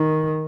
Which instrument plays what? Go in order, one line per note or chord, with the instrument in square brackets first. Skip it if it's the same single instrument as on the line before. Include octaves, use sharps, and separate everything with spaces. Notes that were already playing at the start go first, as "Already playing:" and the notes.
Already playing: [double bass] D#3